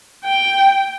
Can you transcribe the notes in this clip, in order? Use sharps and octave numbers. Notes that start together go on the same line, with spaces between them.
G5